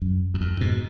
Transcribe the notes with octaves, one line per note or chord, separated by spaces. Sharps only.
F#2
F#2
F2
G#2 B2